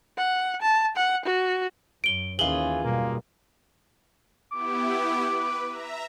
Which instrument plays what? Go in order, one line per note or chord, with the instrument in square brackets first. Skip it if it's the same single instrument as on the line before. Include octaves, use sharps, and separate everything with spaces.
[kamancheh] F#5
A5
F#5
F#4
[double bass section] F#2 [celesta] D7 G7
[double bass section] D#2 D#3 C#4 [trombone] E3 [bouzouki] F4 G#4 [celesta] F#7 G7
[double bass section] F#2 B2 G3 [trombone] A#3
[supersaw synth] B3 E4 G4 [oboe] D6
[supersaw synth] B4
E5 A#5